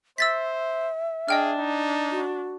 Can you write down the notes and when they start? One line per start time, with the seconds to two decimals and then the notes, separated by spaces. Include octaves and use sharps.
0.18 C5 E5 E6 A6 B6
1.29 D4 G#4 D#5 G5 F6
1.58 D#4
2.11 F#4